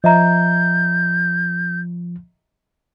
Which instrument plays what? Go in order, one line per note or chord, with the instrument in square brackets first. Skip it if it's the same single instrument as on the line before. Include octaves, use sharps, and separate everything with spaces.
[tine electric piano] F3 [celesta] D#5 E5 A#5 [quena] G6